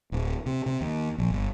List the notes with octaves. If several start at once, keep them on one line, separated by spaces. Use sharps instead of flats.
D1
C3
C3
D#2
A#1
G1